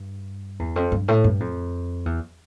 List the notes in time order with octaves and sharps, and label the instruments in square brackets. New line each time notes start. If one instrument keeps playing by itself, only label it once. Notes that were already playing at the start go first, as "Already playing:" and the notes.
Already playing: [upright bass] G2
E2
F2
G2
A2
G2
F2
E2